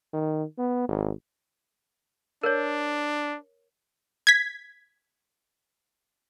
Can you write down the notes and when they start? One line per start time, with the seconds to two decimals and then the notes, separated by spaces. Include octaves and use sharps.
0.13 D#3
0.58 B3
0.89 G#1
2.43 D4 A#4 C#5
4.27 G#6 B6